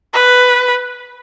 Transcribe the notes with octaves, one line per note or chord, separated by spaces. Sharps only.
B4